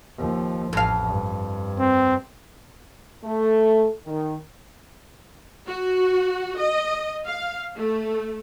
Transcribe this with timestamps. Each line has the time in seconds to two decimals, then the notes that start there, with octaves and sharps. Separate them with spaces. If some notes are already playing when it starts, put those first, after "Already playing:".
0.18 D#2 F3
0.73 A1 F2 F5
1.05 G2
1.79 C4
3.24 A3
4.06 D#3
5.68 F#4
6.61 D#5
7.28 F5
7.77 A3